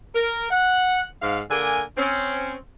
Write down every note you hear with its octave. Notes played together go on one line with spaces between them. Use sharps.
A#4
F#5
G#2 F5
D3 A#3 A#4 G#5
C4 C#4